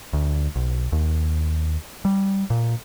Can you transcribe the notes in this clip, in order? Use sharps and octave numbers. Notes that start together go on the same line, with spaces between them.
D2
B1
D#2
G3
A#2